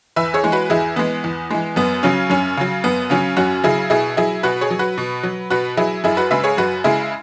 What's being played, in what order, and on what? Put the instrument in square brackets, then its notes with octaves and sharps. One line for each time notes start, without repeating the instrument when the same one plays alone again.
[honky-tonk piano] E2 B4 E5
G#4 C#5
E3 G#3
F#4 B4
E2 E4 G#4
E3 G#3 B3
E2
E3 G#3
F#2 B3
C#3 F#3 C#4
F#2 C#4
C#3 F#3
F#2 B3
C#3 F#3 C#4
F#2 C#4 F#4
C#3 F#3 E4 G#4
B2 E4 G#4
F#3 E4 G#4
B2 F#4 B4
G#4 C#5
F#3
F#4 B4
B2
F#3
B2 F#4 B4
F#3 E4 G#4
F#2 E4 G#4
F#4 B4
C#3 G#3 B4 E5
G#4 C#5
F#2 F#4 B4
C#3 G#3 E4 G#4